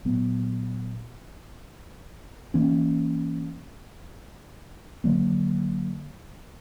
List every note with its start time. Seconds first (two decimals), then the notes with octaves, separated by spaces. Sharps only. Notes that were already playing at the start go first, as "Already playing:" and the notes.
0.05 A#2 F#3 B3
2.54 E3 A#3 C#4
5.04 D3 F#3 A#3